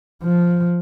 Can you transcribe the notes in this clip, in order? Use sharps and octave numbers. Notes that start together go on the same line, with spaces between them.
F3